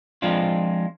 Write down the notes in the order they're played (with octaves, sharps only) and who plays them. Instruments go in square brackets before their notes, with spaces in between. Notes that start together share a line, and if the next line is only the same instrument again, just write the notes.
[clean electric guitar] F3 G#3 C4 D4 F4